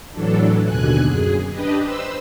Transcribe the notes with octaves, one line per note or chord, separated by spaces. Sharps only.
A2 E3 F#3 D4 A4
D#2 B2 D3 G#5 F#6
F#2 G#4
D4 G4 B4 D#5
B4 C5 E6